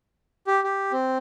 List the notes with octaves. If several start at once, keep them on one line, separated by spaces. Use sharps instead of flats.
G4
G4
C4